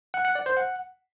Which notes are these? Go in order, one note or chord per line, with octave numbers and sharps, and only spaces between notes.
F#5
F#5
D5
C5
F#5